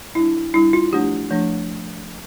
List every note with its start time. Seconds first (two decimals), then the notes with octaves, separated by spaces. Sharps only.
0.15 G3 D4 E4
0.54 G3 D4 E4
0.73 F4
0.92 F3 A3 D4 G4
1.30 F3 A3 D4